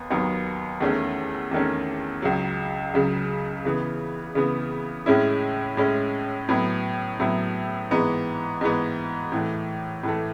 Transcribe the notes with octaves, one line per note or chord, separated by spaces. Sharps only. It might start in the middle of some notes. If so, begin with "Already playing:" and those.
Already playing: D#2 B3
D#2 D#3 F#3 B3
E2 D#3 A3 C#4
E2 D#3 A3 C#4
C#2 C#3 F#3
C#2 C#3 F#3
C#3 E3 B3
C#3 E3 B3
A2 G#3 C#4 E4
A2 G#3 C#4 E4
A2 F#3 B3 E4
A2 F#3 B3 E4
G#2 E3 B3
G#2 E3 B3
A2 E3 A3
A2 E3 A3